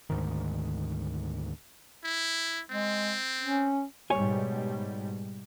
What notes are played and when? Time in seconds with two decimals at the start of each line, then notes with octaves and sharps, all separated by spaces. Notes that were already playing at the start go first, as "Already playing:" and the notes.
0.10 D2 G#2 D#3
2.04 E4
2.70 G#3 C4
3.41 C#4
4.10 G#2 B2 G3 C#5 G#5